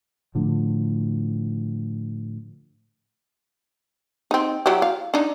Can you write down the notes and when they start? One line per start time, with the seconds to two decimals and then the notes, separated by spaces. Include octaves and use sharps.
0.35 A2 D3 F3
4.31 C4 D#4
4.66 F#3 E4 G4
4.82 F5
5.14 D4 D#4